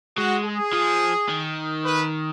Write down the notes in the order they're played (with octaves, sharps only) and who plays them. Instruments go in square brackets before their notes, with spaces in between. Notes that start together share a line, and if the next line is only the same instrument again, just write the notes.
[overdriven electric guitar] G#3 [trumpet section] F#4
[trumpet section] G#4
[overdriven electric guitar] F3
D#3
[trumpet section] B4